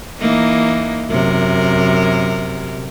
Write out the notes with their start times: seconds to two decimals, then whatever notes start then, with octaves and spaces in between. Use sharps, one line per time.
0.20 E3 A#3 D#4
1.10 F#2 C3 A#4